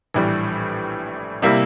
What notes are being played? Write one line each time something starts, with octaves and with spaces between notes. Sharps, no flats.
A#1 A2 E3 G3
C3 G3 A#3 E4